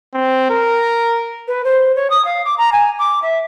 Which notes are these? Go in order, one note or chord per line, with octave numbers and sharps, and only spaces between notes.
C4
A#4
B4
C5
C#5
D#6
F5
D6
A#5
G#5
D6
E5